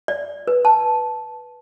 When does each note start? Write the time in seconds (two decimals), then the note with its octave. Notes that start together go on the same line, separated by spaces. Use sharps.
0.08 D5
0.48 B4
0.65 A5